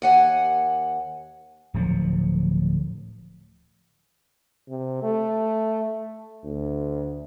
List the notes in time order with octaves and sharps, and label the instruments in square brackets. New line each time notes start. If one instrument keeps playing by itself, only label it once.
[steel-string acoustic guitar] D#2 F#5 G#5
[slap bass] D1 F3 F#3
[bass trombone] C3
A3
D2